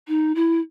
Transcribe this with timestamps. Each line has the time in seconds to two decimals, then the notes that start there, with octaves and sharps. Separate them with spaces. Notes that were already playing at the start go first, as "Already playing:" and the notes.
0.08 D#4
0.35 E4